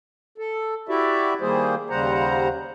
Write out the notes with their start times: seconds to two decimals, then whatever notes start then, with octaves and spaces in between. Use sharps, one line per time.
0.38 A4
0.89 E4 F#4 G4 D5 E5
1.41 D#3 G3 A#3 G#4 C5
1.90 D#2 C#3 G3 C5 F#5 A#5